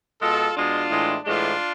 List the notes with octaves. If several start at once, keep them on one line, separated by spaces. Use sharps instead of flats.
B2 G#3 F4 A4
B2 G#3 D4 F4
A2 E3 G#3
A2 E3 G#3 D4 F4